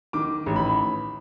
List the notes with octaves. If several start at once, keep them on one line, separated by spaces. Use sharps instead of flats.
D#3 D6
A1
B5